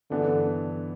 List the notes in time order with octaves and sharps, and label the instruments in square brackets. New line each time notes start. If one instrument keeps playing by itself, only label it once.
[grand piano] G2 E3 B3 D4 [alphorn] D3